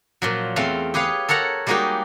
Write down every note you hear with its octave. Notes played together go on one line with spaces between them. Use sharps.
A#2 F3 F#3
E2 A3 C4 F5 C6
G4 G#4 B4 C#5 F5
A4 A#4 C#5 F#5 A#5
G3 G#3 A#3 D#4 F#4 G4